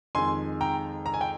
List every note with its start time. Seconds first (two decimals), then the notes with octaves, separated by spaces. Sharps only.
0.15 F2 D#3 G#3 G#5 C6
0.61 G5 A#5
1.06 A#5
1.14 G#5
1.21 G5